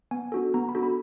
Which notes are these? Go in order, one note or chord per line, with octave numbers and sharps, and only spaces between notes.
B3 G#5
D4 F#4 A4
B3 A#5
B5
D4 F#4 A4
B5